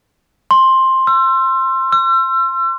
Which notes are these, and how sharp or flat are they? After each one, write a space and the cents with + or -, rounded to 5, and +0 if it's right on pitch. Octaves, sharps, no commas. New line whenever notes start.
C6 +10
E6 +35
E6 +40